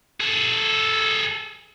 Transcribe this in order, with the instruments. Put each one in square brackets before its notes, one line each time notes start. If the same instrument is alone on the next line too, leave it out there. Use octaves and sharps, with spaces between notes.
[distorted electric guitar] G#4 A4